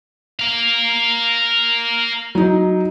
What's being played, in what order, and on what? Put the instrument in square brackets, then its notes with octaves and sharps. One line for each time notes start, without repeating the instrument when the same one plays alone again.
[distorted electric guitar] A#4 F5
[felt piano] F#3 D#4